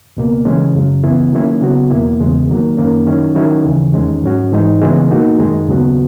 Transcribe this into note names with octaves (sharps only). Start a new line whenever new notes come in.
C#2 B2 A#3
C#3 E3 G#3 C#4
F#2 C#3 F#3
C#2 C#3 E3 B3 E4
D#3 F#3 A#3 C#4 E4
C#3 F#3 B3 F#4
E2 B2 A#3 E4
E2 C#3 G#3 B3
D#3 F#3 A#3
F#2 D#3 A#3 C#4
D#3 F#3 C#4 E4
D#3 F#3 C#4 E4
D#2 C#3 E3
E2 D#3 G#3 C#4
G#2 F#3 C#4 F#4
G#2 E3 G#3 D#4
C#3 E3 G#3 B3
B2 A#3 D#4 F#4
F#2 D#3 G#3
D#2 C#3 F#3 B3 F#4